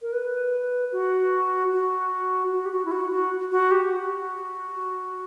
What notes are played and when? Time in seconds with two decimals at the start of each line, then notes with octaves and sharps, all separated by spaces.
0.02 A#4
0.13 B4
0.92 F#4
1.72 F#4
2.52 F#4
2.65 G4
2.71 F#4
2.85 E4
2.91 F#4
3.11 F#4
3.51 F#4
3.71 G4
3.91 F#4